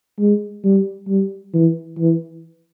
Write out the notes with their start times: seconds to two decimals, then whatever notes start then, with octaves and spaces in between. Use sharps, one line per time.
0.19 G#3
0.64 G3
1.08 G3
1.54 E3
1.99 E3